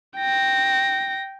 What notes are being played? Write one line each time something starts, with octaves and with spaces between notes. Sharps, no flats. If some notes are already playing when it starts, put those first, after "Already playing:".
G5 A#6